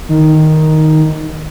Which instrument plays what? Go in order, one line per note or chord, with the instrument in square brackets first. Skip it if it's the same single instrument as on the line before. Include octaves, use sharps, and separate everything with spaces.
[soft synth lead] D#3